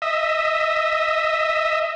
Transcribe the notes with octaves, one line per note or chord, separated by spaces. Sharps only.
D#5 E5